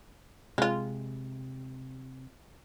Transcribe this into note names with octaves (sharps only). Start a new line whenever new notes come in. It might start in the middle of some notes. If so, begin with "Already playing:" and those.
C3 G#3 F4